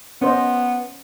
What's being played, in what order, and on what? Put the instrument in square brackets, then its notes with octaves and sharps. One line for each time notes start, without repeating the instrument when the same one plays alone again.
[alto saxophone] B3 [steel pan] C#4 C5 D#5